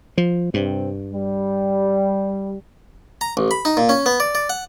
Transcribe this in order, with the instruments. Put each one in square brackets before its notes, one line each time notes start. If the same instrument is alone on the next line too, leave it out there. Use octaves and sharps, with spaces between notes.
[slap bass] F3
[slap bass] G2 [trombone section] C3 C4
[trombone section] G3
[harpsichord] A#5
A1
B5
D#4
A#2
C#4
B3
D5
D5
F#5